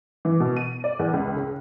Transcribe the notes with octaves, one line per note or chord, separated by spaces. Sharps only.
E3
B2
D#7
D5
E2
C#2
C#3